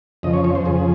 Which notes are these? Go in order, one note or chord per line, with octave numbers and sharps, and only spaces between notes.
F2 C#3 F3 D#5
C#5
C#5
C5
F2 C#3 F3 G#4